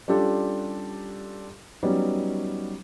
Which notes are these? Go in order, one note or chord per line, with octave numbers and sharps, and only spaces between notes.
G3 C#4 D4 F4 G4 A4
F#3 G3 B3 C#4 D#4